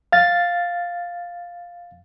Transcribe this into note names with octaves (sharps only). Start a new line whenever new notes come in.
F5 A6